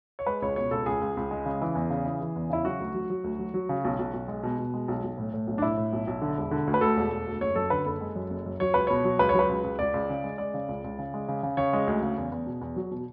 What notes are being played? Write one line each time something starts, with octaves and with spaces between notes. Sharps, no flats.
C#5
G#3 B4
C#2 C#5
B2 C#5
C#2 A4
C#2 G#4
C#2
C#2
G#3
C#3
E3
E2
C#3
E3
E3
E2
C#3 E4
F#3 F#4
D2
F#3
F#3
D2
F#3
F#3
C#3
B1
B1
B1
G#3
B2
B2
G#3
B1
B1
A2
A2
B1
D4
A2 E4
A2
B1
B1
D3
E1
D3
D2
B4
D2 A4
E1
E1
D2
F#1 C#5
F#2 A4
D3 B4
F#1 A4
G#3
F#2
F#1
F#2
F#3 C#5
C#2 B4
B2 C#5
F#3
C#2 B4
C#5
F#3 B4
C#2
C#2
C#2 D5
C#2
C#3
G#3
G#3 D5
C#3
C#2
C#2
C#3
G#3
C#3
C#3
C#3 C#5
G#3
D2
C#3
E2
E2
B2
E2
F#3
B2